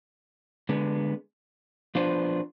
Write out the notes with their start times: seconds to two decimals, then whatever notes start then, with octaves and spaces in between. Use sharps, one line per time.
0.69 D3 G#3 B3
1.95 F3 B3 D4 F4 C5